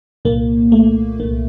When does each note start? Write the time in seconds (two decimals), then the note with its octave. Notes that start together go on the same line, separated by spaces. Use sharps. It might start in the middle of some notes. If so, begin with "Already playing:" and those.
0.25 C2 A#2 A#3
0.72 A3
1.20 C2 A#2 A#3